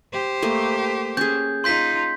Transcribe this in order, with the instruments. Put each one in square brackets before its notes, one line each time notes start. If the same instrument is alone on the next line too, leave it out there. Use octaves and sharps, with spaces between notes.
[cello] G4 C5
[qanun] A3 A#3 D#5
[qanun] C#4 G#4 [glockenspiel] G6
[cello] D#4 F4 [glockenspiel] C6 G6 B6